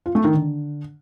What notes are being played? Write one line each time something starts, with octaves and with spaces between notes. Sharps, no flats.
F4
A3
D#3
D3